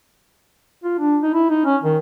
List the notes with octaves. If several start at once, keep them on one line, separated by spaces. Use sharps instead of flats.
F4
D4
D#4
E4
D#4
C#4
D#3